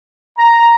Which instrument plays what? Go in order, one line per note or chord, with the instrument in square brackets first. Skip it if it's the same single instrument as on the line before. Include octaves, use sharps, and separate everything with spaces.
[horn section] A#5